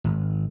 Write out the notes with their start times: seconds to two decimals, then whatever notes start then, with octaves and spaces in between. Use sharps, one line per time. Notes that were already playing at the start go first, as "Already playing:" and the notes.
0.04 G#1